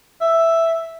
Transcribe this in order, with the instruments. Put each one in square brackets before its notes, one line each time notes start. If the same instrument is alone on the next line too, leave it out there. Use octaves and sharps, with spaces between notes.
[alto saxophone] E5